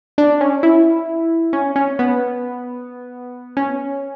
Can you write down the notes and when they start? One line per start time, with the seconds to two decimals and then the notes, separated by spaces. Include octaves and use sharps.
0.18 D4
0.41 C#4
0.63 E4
1.53 C#4
1.76 C#4
1.99 B3
3.57 C#4